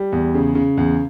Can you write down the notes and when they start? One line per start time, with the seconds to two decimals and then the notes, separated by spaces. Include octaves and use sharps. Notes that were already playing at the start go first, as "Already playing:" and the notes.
Already playing: G3
0.12 E2
0.34 C#3
0.55 C#3
0.77 E2